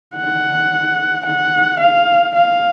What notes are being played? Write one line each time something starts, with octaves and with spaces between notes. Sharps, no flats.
F#5
F#5
F5
F5